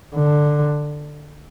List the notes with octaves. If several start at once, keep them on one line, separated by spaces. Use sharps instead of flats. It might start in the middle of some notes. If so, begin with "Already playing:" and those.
D3